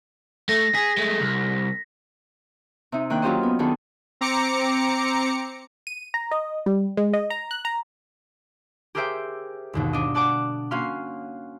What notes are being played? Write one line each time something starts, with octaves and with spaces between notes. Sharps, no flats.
A3 A#6
G#4 B6
G#3 A3
C2
C3 D#4
D#3 A#3 D4 G5 F#6
F#3 C#4 F4 G4 C5 D#5
B3
D#3 B3 D4 G#4 A4
C4 A#5 D6 C#7
D#7
A#5
D#5
G3
G#3
D#5
A#5
F#6
A#5
G4 G#4 A#4 C5 E5 G5
G1 D#2 B2
D4 D#5
D5 F#5 A5 D6 D7
A#3 C#4 F#4 F5 C6